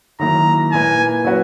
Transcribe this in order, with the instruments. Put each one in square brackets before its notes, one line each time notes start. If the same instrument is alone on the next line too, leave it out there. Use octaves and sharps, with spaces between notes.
[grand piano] D#3 F#3 A#3 E4 [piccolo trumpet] A#5
[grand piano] A#2 A#3 E4 B4 [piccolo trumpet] G#5
[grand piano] F#3 C#4 F#4 B4